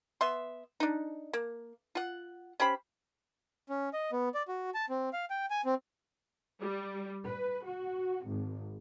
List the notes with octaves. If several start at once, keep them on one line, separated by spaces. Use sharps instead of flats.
B3 E5 C6
D4 D#4
A#3
F4 F#5
C#4 G4 C5 B5
C#4
D#5
B3
D5
F#4
A5
C4
F5
G5
G#5
C4
G3
B4
F#4
G#1